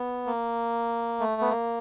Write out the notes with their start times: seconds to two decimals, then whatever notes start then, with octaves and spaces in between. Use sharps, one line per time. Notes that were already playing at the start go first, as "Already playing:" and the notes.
Already playing: B3
0.26 A#3
1.20 A3
1.41 B3
1.51 A#3